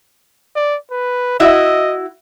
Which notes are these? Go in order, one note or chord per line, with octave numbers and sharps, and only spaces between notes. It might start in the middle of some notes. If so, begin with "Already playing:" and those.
D5
B4
E4 F#4 D#5 E5